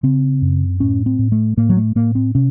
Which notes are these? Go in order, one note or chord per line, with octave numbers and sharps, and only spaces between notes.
C#3 C4
F#2
A2 C#4
C4
A2
A3
A2 A#3
F#3
A3
A2 A#3
C4
C3 C#4